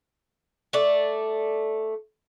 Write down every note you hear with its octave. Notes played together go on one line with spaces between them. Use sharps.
A3 D5